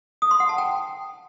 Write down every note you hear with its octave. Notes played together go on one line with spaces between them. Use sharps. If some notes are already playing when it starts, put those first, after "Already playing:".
D#6
C6
F#5
A5
G5